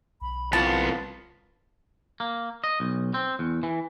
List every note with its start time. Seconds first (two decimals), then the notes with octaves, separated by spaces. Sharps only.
0.22 B1 B5
0.53 C2 B3 F4 A5
2.20 A#3
2.64 D#5
2.80 B1
3.14 C4
3.39 E2
3.63 E3